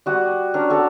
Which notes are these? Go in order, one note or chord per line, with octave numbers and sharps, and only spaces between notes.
G3 F#4 D#6
C#4 D4 A#4
F#4 A4 C#5